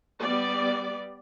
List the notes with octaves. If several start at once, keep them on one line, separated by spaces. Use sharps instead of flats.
G3 B3 D5